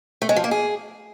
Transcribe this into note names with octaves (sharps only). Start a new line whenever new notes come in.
A3
G#3
F3
A#3
G#4